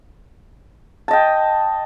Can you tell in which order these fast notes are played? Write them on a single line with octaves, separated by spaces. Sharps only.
A5 D#5 G5